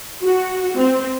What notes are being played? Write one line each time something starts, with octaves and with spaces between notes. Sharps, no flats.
F#4
C4